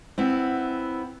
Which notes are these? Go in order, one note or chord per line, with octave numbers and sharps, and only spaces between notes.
B3 C4 E4